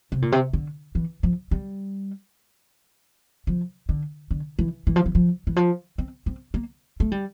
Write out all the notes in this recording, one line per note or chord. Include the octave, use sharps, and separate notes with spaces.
C3
A#2
C3
D3
E3
F3
G3
F3
D3
D3
E3
E3
F3
E3
F3
E3
F3
C4
C4
A#3
A3
G3